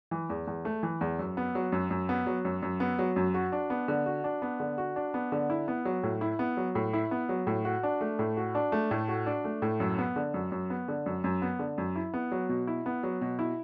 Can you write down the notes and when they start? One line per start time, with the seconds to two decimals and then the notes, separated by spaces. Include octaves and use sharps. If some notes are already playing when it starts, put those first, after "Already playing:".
0.11 E3
0.30 E2
0.47 E2
0.65 A3
0.83 E3
1.01 E2
1.19 F#2
1.37 B3
1.55 F#3
1.72 F#2
1.91 F#2
2.09 B3
2.26 F#3
2.45 F#2
2.62 F#2
2.80 B3
2.99 F#3
3.16 F#2
3.34 F#4
3.52 D4
3.70 B3
3.88 D3
4.06 F#4
4.24 D4
4.42 B3
4.60 D3
4.78 F#4
4.96 D4
5.14 B3
5.32 D3
5.50 E4
5.68 B3
5.85 F#3
6.03 A2
6.21 E4
6.39 B3
6.57 F#3
6.75 A2
6.93 E4
7.11 B3
7.29 F#3
7.47 A2
7.65 F#4
7.83 D4
8.01 A3
8.19 A2
8.37 F#4
8.55 D4
8.72 A3
8.91 A2
9.08 F#4
9.26 D4
9.45 A3
9.62 A2
9.80 F#2
9.98 B3
10.16 D3
10.34 F#2
10.52 F#2
10.70 B3
10.88 D3
11.06 F#2
11.24 F#2
11.42 B3
11.59 D3
11.78 F#2
11.96 E4
12.14 B3
12.31 F#3
12.49 B2
12.67 E4
12.86 B3
13.03 F#3
13.21 B2
13.39 E4